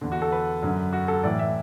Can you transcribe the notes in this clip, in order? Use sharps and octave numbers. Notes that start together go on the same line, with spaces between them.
E2 D3
F#4
A4
B4
F#2 D3
F#4
A4
A2 E3 D5
E5